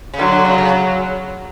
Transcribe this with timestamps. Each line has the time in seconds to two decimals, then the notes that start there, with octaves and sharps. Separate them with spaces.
0.14 C#3
0.19 D3 F#3
0.32 D3
0.45 C#3
0.58 C#3